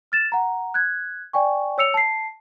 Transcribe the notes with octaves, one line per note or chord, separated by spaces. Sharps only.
F6 A6 E7
F#5 A#5
F#6 G#6
D5 G5 G#5 C#6
C#5 E6 C#7 F7
A5 C7